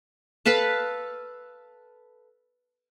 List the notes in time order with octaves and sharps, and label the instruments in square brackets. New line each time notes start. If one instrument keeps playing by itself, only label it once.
[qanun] A4 B4 F5 A5